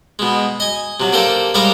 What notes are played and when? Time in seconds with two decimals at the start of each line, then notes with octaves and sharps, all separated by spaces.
0.19 B2 G#3
0.60 D#5 G#5
1.00 C3 F#3
1.13 A#3 D4 G4 A4 C5
1.54 G3 G#3 G4 A#4 C5 F5